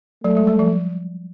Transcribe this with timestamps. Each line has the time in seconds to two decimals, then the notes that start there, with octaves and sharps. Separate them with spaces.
0.24 F#3 A3
0.37 G#3
0.47 G3
0.59 F3